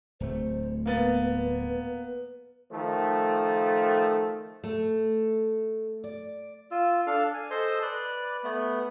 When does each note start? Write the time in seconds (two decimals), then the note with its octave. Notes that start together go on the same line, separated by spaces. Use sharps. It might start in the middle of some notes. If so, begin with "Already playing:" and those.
0.20 D1 A3 C5
0.86 A#3 B3 B4 A6
2.72 D#3 F3 A3
4.64 A3
6.04 D5
6.71 F4 E6
7.07 D4 A4 F5
7.34 G#5
7.50 A4 C5 D#5 C6
7.82 B4 D5
8.44 A3 B3